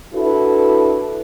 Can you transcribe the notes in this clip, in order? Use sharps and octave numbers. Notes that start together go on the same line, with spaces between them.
D4 E4 F#4 A4 B4